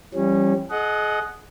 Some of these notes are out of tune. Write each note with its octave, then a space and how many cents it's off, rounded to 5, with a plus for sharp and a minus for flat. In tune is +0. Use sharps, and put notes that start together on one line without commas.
E3 +45 G3 +0 C#4 -20
G#4 +40 D#5 +0 F#5 +0